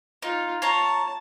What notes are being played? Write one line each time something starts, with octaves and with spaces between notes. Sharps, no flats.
D#4 F4
F4 C#5 A5 A#5